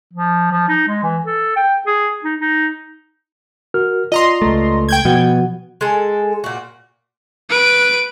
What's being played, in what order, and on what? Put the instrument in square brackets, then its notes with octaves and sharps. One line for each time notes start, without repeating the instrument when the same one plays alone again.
[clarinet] F3
F3
D#4
G#3
E3
A4
G5
G#4
D#4
D#4
[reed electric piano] F#4 A#4 F6
[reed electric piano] F4 D5 [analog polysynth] D#5 A#5 C6
[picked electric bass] C#2 A3
[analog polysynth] G5 G6 G#6
[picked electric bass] B2 B3 [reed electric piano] F3 F#4 F#5
[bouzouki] G#3 G#4 A4
A#2 F#4
[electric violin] B4 D7